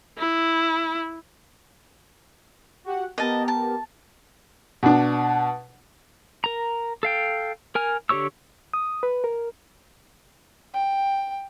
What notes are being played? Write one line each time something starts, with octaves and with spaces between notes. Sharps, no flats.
E4
F#4 G4 F#5
B3 G4 A#4 D#5 A5
A5
B2 D4
A#4 A#5
A4 F5 G5
A#4 G#5 F6
D3 G4 C#5 C#6 E6
D#6
B4
A#4
G5